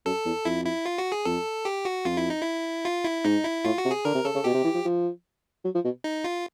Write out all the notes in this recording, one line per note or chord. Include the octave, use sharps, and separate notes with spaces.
F#2 A4
E2
F2 E4
E4
F4
F#4
G#4
F2 A4
G4
F#4
F2 F4
E4
D#4
E4
F4
E4
G#2 D#4
E4
A2 F4
F#4
C3
G#4
D3 A#4
C3
C#3 A4
C#3
B2 G4
C3
E3
F3
F3
F#3
F3
B2
D#4
F4